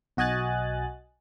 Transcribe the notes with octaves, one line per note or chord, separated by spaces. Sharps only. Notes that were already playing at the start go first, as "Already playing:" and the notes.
B1 F#4 D#5 G#5 F#6 A6